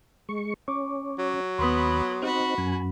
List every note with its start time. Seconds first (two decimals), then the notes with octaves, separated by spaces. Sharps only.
0.29 G#3 C#6
0.68 C#4 C#6 D6
1.18 F#3
1.59 D#2 B3 B4 C6 D#6
2.22 C4 D#4 F#4 B5
2.58 F#2 G#5